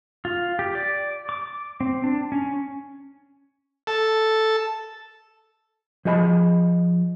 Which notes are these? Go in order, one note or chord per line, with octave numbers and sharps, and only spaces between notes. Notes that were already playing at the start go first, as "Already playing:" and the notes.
F4
G4
D5
D6
C4
D4
C#4
A4
F3 G#4 D#5 F#5 B5